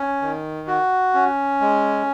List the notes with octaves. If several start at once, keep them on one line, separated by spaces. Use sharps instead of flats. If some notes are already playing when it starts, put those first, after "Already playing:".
Already playing: C#4
D#3
F#4
C#4
G#3